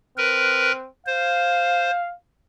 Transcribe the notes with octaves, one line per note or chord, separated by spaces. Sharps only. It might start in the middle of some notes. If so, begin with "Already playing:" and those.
C4 A#4 B4
C5 F5